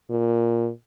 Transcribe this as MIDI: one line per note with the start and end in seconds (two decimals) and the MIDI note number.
0.10 0.69 46